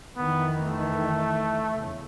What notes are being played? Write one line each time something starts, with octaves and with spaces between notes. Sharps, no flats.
F2 D#3 E3 B3
A3
E2 C#3